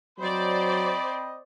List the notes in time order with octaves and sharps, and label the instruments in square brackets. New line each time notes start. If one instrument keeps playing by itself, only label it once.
[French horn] F#3 [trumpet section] C4 D#5 B5 [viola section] C5 D5